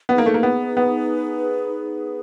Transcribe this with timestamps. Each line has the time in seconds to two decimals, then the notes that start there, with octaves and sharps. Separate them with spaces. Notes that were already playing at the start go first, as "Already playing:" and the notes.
0.09 B3 D#4 G#4 B4
0.18 A#3
0.26 A3
0.34 A#3
0.43 B3
0.77 B3